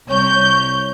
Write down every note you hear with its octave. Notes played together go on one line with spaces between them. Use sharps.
C2 C#5 G6